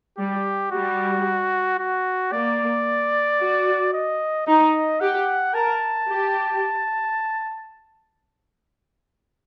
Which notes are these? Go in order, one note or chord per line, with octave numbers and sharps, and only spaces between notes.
G3 G4
G3 F#4
F#4
A#3 D5
F#4
D#5
D#4 D#5
G4 F#5
A#4 A5
G4